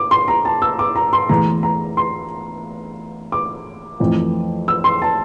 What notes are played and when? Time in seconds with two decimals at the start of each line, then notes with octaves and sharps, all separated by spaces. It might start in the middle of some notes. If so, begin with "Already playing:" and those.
Already playing: D6
0.11 C6
0.28 A#5
0.45 A5
0.62 E6
0.79 D6
0.96 A#5
1.13 C6
1.29 E2 E3 A3 A#5
1.63 A#5
1.97 C6
3.32 D6
4.00 F2 E3 A3
4.68 E6
4.84 C6
5.02 A5